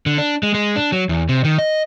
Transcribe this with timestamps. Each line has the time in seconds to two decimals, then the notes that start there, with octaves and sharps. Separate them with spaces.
0.06 D3
0.18 D4
0.43 G#3
0.54 G#3
0.76 D4
0.92 F#3
1.09 E2
1.29 C3
1.44 D#3
1.59 D#5